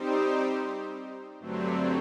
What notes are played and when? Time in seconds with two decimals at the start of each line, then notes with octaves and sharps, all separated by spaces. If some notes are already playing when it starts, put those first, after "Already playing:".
Already playing: G3 C4 D#4 G4 C5
1.40 G2 D3 F#3 A3 C4